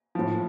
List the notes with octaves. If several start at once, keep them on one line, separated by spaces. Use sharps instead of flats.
A2 F3